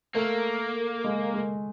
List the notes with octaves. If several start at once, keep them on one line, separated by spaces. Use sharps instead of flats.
A3 A#3
G#3
G#3